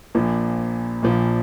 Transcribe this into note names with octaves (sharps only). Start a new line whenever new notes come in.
A#1 A#2 F3
A#1 A#2 F3